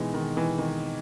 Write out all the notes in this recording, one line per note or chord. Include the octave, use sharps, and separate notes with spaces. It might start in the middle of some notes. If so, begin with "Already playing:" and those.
Already playing: B2 E3 G#3 D#4
D#3
E3
D#3